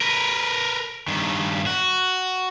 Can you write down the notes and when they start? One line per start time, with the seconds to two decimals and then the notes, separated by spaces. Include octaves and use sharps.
0.01 A#4 B4
1.08 G2 D#3
1.66 F#4